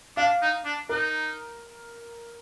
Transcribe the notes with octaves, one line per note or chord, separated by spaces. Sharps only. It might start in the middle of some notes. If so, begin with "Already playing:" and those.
D4 F5
D#4
D4
D#4 A#4